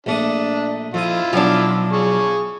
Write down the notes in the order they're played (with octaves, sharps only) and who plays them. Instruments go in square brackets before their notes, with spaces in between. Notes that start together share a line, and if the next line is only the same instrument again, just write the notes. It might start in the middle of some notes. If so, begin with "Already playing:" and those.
[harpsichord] A#1 A3 D#6 [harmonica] D4
[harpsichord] F2 D#6 [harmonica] E4 F4
[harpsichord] B1 F#3 [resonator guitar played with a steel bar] F3 D4
[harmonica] G#4 C#6